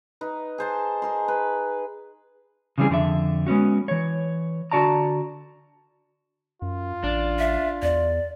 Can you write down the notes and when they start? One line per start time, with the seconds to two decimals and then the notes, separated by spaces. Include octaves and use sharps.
0.21 D#4 B4
0.58 G#4 C5 A5
1.02 G#4 A#4 C6
1.28 B4
2.78 C#3 E3 G3 C4 G#4
2.90 F2 D3 E4 E5
3.47 G#3 B3 C#4 F#4
3.88 E3 C#5
4.71 D3 F#4 D5 A5 A#5
6.62 F#2 F4
7.04 A1 D4
7.39 E5
7.82 E2 D5